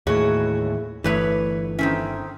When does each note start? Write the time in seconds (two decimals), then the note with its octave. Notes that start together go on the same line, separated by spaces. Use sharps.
0.07 D#2 A2 E3 A3 F#4 G#4 C#5
1.04 G1 E2 E3 A3 B4 C#5
1.79 D#3 C4 C#4 E4 A4